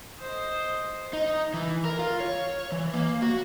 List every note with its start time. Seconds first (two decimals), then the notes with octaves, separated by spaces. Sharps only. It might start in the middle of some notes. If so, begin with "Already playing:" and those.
0.21 C5 D#5
1.13 D#4
1.54 E3
1.85 A#4
1.99 F4
2.20 C#5
2.72 E3
2.94 A#3
3.22 F#4